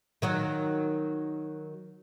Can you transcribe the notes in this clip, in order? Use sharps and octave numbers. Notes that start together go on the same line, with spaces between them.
D#3 F#3 F#4